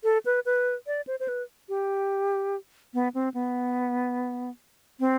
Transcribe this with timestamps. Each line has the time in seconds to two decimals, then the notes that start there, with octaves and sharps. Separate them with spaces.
0.04 A4
0.25 B4
0.46 B4
0.87 D5
1.07 C5
1.20 C5
1.28 B4
1.69 G4
2.94 B3
3.14 C4
3.34 B3
5.00 C4